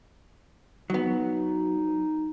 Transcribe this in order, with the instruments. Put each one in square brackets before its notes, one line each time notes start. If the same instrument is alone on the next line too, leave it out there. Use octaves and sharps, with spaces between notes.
[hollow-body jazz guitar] F#3 B3 [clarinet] D#4